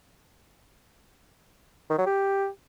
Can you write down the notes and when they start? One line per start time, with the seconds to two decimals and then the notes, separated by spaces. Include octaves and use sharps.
1.90 D#3
1.98 F#3
2.06 G4